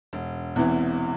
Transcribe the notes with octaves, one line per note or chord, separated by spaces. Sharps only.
E1
E2 C3 E3